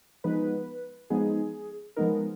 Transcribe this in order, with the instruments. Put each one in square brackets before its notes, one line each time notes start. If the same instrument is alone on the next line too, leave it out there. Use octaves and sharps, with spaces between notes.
[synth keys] F3 G#3 B3 D#4 B4
F3 G#3 B3 D#4 G#4
F3 G#3 B3 D#4 A#4